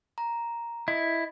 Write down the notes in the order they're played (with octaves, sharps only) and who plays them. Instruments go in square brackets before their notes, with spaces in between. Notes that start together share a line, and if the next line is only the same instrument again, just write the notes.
[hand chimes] A#5
[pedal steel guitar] E4 [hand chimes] D#5